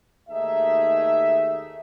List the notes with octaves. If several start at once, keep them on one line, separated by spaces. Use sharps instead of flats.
D#2 A3 D#4 G#4 E5